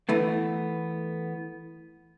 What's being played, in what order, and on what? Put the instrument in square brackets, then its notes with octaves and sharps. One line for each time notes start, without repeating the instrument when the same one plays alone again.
[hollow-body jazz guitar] E3 A3 B3